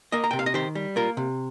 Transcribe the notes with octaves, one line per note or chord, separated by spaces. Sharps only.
A#3 A#4 D#5
A#5
C3 G5
F5
D#5
D#3 G4 C5
G3
A#3 F4 A#4
C3